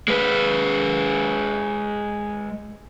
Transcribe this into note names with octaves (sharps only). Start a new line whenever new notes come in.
G#3 B4